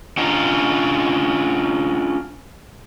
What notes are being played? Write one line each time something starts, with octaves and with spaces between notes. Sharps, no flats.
C#4 D4 F4 D#5 F5 A#5